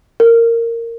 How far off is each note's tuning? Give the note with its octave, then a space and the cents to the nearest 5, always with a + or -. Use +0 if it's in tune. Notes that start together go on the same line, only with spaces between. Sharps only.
A#4 -15